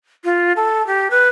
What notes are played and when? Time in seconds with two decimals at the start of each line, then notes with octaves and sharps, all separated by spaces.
0.24 F4
0.56 A4
0.87 G4
1.11 B4